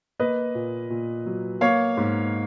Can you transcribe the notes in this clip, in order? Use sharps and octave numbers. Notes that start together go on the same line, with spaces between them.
A#3 B4 D#5
A#2
A#2
F#3
A#3 C#5 F5
G#2